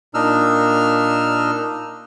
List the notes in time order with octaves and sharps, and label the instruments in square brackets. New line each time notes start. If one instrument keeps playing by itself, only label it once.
[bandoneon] A#2 D4 D#4 E6 F6